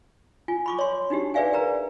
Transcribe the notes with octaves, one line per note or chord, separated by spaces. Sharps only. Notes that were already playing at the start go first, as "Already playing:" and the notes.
F4 G#5
B5 C#6 D6
C#5 C6
D4 D#4 F#4 G4
G#4 B4 D5 E5 F5 G#5
A#4 B4 A#5